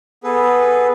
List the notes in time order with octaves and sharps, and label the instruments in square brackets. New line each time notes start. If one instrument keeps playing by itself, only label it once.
[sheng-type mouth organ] B3 G#4 A4 B4